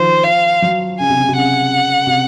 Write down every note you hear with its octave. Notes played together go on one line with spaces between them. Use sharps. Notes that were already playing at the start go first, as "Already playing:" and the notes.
Already playing: D#3 F3 C5
F5
F#3
C#3 G#5
C3
C#3
C3
C#3 F#5
C3